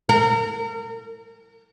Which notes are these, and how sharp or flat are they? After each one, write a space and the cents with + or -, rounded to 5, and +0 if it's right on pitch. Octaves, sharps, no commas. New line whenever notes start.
A#4 -35